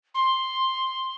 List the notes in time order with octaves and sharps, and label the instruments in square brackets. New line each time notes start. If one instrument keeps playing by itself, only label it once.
[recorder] C6